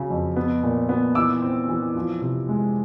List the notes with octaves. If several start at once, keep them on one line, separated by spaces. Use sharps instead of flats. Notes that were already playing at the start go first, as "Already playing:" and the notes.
Already playing: C#3 F#3
F2
B3
A#2
B3
E3 D6 E6
C4
E3
F3
C3
G#3